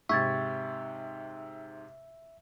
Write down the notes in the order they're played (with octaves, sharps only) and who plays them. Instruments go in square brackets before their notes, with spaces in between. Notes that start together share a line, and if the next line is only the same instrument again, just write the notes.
[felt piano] G#2 C3 [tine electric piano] E5 [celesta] C#6 G#6 A6